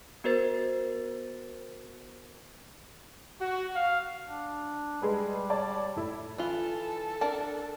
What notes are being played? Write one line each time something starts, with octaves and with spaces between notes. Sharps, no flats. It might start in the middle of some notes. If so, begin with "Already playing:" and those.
B3 F#4 A#4 C5 A6
F#4
F5
D4
G3 G#3 G#4 B4
C#5 D5 A5
A2 E4
E3 F4 A4
D4 A#4 A5